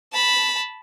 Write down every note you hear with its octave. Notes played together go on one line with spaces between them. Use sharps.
A5 B5